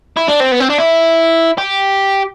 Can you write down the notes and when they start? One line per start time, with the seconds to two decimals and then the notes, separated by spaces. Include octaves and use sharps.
0.17 E4
0.28 D4
0.40 C4
0.51 B3
0.60 C4
0.69 D4
0.78 E4
1.58 G4